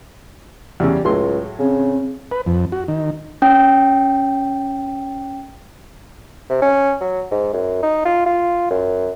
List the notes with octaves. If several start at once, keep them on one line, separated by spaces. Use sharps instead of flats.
E2 C#3 G3
C#2 A2 F#3 C6
C#3 C4
B4
F2
F#4
D#3
C#4 G5
C3
C#4
F#3
G#2
F#2
D#4
F4
F4
F#2